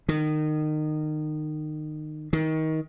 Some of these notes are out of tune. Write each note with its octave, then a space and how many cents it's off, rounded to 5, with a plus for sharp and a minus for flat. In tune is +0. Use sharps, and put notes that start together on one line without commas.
D#3 -25
D#3 +25